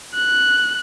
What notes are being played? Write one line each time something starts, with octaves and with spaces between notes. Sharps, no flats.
F#6